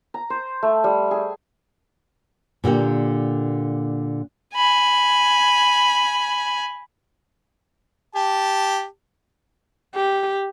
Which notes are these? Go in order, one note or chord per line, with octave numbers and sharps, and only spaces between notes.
A#5
C5
A3
G3
G#4
A#2 D3 A#3 G4
G#5 B5
G4 A5
G4